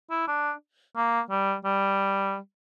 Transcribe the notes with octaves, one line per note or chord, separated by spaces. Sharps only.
E4
D4
A#3
G3
G3